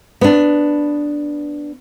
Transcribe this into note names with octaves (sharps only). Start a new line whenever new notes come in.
B3 D4